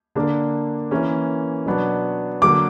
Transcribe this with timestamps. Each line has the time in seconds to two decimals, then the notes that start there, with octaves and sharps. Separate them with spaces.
0.15 D3 A#3 D4
0.91 E3 A#3 C#4
1.66 B2 F#3 B3 D4
2.42 D3 F#3 A#3 D6